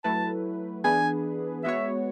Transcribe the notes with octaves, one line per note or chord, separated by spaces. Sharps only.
F#3 A3 E4 B4 A5
E3 B3 D4 G#4 B4 G#5
G#3 B3 F#4 C#5 E5